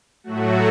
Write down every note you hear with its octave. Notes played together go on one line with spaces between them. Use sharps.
A2 F#3 A3 F#4